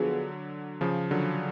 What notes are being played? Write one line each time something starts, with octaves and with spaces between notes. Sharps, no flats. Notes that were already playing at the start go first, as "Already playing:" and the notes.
Already playing: D3 F3 F#3 B3 F4 G#4
C#3 F3
D3 F#3